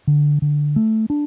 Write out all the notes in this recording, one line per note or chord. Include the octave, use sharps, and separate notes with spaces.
D3
D3
A3
D4